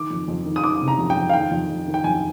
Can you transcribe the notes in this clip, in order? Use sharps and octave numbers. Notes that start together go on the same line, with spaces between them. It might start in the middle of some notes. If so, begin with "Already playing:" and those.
Already playing: D#3 D6
F2
F2
D#3
D#6
D#3 D6
C3
A#5
F2
G5
F2
F5
D#3 G5
F2
F2
D#3
G5
F2 G#5